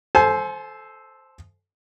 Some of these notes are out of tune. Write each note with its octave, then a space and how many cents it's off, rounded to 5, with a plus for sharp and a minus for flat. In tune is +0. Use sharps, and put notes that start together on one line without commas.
A4 -10 C5 +0 G#5 +35